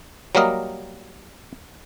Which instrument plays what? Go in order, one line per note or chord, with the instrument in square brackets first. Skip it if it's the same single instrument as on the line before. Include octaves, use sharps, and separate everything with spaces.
[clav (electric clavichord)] F#3 G3 A#3 A#4 D#5